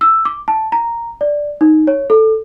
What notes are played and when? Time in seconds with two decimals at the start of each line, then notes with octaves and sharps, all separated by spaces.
0.01 E6
0.25 D6
0.48 A5
0.72 A#5
1.21 D5
1.61 D#4
1.87 C#5
2.10 A4